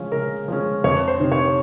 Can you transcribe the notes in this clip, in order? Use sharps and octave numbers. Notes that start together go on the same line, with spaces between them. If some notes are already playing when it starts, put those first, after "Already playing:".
Already playing: C#3 F3 G#3 C#4
C#3 A#4
F3 G#3 C#4
F2 C#5
C5
C3 D#3
C#5